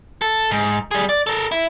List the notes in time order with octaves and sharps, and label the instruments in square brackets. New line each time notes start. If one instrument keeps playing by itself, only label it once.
[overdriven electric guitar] A4
G#2
G3 G#4
D5
A4 A#4
E4